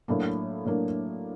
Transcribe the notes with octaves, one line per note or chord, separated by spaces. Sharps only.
A2 F#3 A#3 D4
A2 F#3 A#3 D4